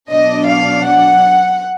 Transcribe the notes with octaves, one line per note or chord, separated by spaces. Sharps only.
B2 F#3 D4 D#5
F5
F#5